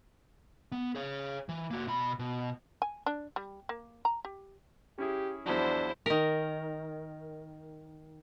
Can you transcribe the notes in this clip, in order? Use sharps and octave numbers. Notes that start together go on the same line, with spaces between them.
B3
G#4 C#5
E3
A#3 F#4
B2 B5
B2
G#5
D4
G3
A#3
A#5
G4
C#4 E4 G4 G#4
E2 F3 F#3 D4 E4 C5
D#3 A#4